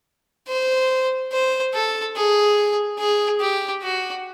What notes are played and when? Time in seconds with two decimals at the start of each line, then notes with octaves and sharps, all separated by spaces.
0.48 C5
1.32 C5
1.74 A4
2.16 G#4
2.99 G#4
3.41 G4
3.83 F#4